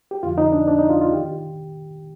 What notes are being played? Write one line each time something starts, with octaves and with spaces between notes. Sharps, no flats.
G4
F2 D3 F3 F4
D#4
D4
D4
D#4
F4
F4
D#3 G4